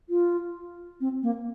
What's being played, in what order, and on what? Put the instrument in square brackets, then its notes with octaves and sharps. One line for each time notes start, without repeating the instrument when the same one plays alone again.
[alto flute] F4
C4
A#3